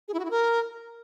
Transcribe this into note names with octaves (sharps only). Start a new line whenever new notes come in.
G#4
E4
F#4
E4
A#4